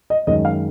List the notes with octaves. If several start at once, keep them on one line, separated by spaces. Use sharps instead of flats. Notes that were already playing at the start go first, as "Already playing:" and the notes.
D#5
F#2 D#3 G#3 C#4 D#5
F5